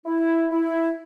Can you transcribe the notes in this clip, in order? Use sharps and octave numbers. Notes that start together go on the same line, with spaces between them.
E4
E4